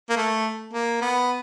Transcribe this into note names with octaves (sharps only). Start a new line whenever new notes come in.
A#3
A3
A#3
B3